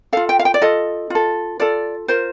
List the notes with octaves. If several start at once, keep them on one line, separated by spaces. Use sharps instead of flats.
F4 A4 F5
G5
F5
G5
D5
F4 A4 D#5
F4 A4
F4 A4 D5
F4 A#4 C5